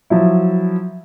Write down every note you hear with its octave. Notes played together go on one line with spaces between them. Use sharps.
F3 F#3 E4